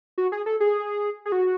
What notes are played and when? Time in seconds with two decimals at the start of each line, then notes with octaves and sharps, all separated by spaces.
0.18 F#4
0.32 G#4
0.46 A4
0.60 G#4
1.25 G#4
1.32 F#4